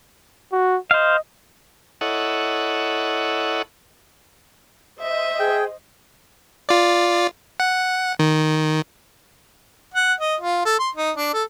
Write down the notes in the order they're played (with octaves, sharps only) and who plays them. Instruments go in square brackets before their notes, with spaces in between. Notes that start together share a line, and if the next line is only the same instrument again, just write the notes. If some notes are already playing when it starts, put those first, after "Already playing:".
[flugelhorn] F#4
[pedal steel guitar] C5 F5 [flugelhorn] D#5
[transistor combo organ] E4 A4 C#5 D#5 F#5
[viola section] C5 D#5 [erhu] E5
[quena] G#4 [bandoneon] G5
[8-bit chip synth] F4 D5
F#5
D#3
[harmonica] F#5
D#5
F4
A4
C6
D#4
D4
A4